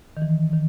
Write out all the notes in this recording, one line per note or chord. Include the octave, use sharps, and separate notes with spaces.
D#3
E3
D#3